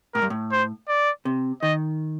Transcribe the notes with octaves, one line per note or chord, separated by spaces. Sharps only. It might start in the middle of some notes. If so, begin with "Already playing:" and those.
A2 A#4
G2
A2
C5
D5
C3
D#3 D#5